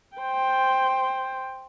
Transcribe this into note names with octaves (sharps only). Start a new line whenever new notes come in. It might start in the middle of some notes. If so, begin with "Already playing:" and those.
C5 G5